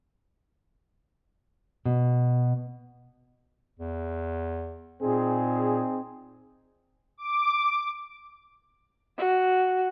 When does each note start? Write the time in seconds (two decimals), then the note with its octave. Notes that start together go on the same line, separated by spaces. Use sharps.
1.85 B2
3.79 E2
5.02 A#2 C4 D#4 G#4
7.17 D6
9.18 F#4